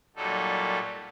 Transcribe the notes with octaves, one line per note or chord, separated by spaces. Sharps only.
A#2 F#3 G3 D#4 A4